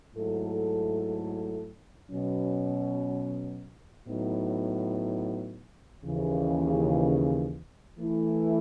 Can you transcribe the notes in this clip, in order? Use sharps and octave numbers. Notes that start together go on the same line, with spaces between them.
G#2 F#3 A3 E4 A4
B2 F#3 C#4
A2 F#3 B3 D#4
D#2 C#3 E3
E3 A3 E4